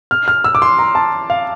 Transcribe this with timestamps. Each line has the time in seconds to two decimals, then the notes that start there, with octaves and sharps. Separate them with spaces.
0.11 F6
0.28 F6
0.44 E6
0.55 D6
0.62 C6
0.79 A#5
0.95 A5
1.30 F5